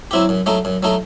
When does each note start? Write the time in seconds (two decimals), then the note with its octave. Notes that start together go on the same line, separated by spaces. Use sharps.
0.11 F#3 C4 E4 G4
0.29 F#2
0.46 F#3 A3 D#4
0.65 F#2
0.83 F#3 A3 D#4